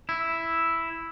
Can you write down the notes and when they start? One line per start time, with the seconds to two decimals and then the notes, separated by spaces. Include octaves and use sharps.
0.09 E4